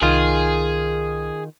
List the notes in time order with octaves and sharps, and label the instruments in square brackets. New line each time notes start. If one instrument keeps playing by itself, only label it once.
[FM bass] C2 [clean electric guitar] D#3 F4 [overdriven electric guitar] G#4